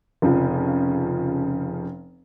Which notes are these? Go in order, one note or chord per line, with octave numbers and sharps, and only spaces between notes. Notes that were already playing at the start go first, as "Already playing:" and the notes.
F1 C#3 F3